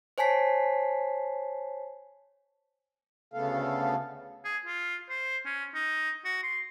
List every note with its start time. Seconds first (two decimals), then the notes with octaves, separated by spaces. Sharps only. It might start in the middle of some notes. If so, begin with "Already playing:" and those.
0.18 C5 C#5 G#5 A5 B6 C7
3.34 D2 C#3 A3 B3 A4 F5
4.45 G#4
4.65 F4
5.09 C5
5.45 C#4
5.74 D#4
6.25 F#4
6.43 C6